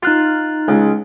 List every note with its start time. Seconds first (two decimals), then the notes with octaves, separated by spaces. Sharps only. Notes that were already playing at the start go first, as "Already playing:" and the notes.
0.03 D#4 F4 F#6 A6
0.68 C#2